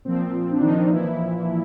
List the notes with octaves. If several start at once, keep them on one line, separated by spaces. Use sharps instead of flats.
A#2 F3 C4
D4
D#3 D#4
A#2 E3 F3 E4